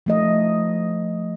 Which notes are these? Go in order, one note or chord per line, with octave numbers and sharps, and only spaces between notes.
F3 A3 D#5